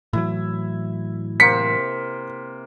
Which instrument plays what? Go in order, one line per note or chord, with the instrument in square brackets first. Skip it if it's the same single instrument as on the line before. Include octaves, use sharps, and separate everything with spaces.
[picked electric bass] A2 E3 F#3 [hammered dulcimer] E4
[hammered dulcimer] C3 A#3 C5 [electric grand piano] B6 C#7